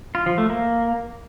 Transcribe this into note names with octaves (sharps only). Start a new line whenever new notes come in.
F4
F3
A3
A#3